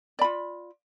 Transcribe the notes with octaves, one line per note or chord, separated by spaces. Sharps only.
F4 D5 B5